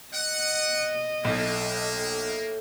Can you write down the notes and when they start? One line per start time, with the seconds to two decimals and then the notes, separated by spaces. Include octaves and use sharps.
0.13 D#5 F#5
1.25 B1 A2 A#3